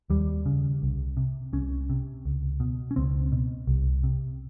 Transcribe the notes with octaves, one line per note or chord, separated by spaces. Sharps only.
D#2 G3
C#3
C2
C3
C2 C#4
C3
C#2
B2
C#4
C#2 C4
B2
C2
C3